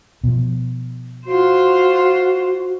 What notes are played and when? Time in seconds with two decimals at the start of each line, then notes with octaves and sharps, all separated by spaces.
0.24 B2 F3
1.26 F4 F#4 C5